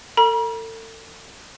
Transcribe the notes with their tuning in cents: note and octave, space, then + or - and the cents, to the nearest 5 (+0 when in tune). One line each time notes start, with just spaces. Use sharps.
A4 +40 A#5 +45